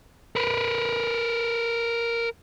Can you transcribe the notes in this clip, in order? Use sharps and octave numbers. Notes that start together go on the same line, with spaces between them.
A#4 B4